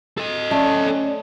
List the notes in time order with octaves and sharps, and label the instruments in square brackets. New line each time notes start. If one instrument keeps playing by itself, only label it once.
[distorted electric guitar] A4 D#5
[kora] A3 [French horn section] C#4 D5